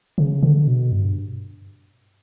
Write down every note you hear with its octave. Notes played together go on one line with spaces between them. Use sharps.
C#3
D3
B2
G2